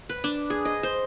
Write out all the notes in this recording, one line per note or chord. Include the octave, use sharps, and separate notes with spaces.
B4
D4
G#4
D#5
C5